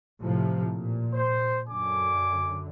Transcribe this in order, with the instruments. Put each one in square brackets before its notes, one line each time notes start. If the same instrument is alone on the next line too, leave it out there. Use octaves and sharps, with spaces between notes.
[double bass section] A2 C3 F3
A#2
[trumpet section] C5
[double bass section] F#2 D3 [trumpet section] G#5 D6